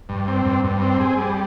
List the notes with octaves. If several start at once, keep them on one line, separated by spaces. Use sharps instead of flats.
G2
C4
G2
G2
C4
G#4
G3